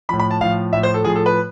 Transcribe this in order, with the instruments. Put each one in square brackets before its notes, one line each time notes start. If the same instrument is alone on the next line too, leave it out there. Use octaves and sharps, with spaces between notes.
[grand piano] F3 B5
A2
B5
A5
A2 F3 F5
A2 F3 E5
C5
A4
A2 F3 G#4
A4
B4